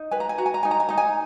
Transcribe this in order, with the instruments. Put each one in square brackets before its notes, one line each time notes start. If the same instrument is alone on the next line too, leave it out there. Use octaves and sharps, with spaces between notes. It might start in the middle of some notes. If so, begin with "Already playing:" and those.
Already playing: [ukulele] D#4
B4 G#5
A#5
G#5
F#4 A#5
G#5
A#5
D#4 G#5
A#5
G#5
D#4 A#5
G#5